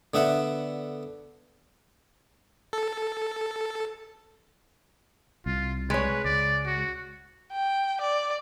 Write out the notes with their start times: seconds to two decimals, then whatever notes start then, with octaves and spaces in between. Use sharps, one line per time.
0.14 D3 B3 E5 F#5
2.73 A4
5.46 C2 F4
5.90 G#3 B4 C#5
6.25 C#2 D5
6.66 F#4
7.52 G5
8.01 D5